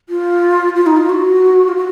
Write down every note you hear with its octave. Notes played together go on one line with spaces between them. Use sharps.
F4
F4
D#4
F4
F#4
F4
F#4